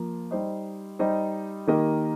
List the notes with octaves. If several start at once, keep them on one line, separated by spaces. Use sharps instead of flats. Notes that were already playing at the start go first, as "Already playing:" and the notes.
Already playing: F3 A#3
G3 D#4 C5 D#5
G3 D#4 C5 D#5
D#3 A#3 G4 A#4 D#5